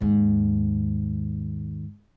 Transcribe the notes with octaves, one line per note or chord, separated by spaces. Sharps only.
D#2 G#2